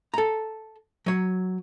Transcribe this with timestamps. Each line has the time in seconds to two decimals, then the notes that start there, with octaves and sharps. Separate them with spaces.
0.14 A4 A#5
1.06 F#3 C#5